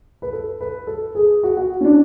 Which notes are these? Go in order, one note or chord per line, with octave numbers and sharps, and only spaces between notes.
B4
A4
B4
A4
G#4
F#4
F#4
C#4
D4